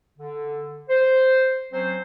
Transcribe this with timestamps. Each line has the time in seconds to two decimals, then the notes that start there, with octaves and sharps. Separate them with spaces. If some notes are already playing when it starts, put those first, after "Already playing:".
0.18 D3
0.89 C5
1.72 F#3 C4 C#4 C5